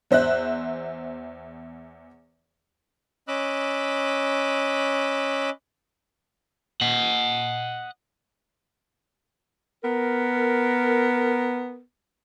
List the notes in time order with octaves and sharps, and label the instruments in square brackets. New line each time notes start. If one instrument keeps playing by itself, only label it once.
[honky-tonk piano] E2 C5 E5 F#6
[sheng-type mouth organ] C#4 D#5 B5 D6 E6 F#6
[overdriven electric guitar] D#5 F#5
[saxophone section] B3 A#4